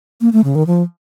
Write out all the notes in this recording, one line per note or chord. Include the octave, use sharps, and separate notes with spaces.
A#3
A3
C#3
D#3
F3